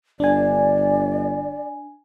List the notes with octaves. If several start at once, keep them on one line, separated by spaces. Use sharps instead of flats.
G1 D4 D5 G#5